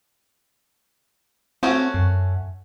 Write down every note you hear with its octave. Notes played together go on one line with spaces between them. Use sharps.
A3 C4 C#4 F#4
F#2